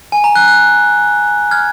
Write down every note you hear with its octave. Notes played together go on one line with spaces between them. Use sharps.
G#5
A#5
F#6
F#6
F6 G#6